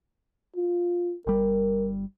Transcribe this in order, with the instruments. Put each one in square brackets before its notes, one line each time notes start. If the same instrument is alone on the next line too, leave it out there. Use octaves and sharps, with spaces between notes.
[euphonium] F4
[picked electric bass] G1 G3 [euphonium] A#4